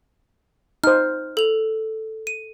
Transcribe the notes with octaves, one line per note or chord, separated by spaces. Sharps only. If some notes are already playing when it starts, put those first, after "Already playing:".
D#4 C5 F6
A4 F7
D#7